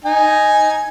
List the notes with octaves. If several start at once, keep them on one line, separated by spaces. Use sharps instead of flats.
D#4 G#5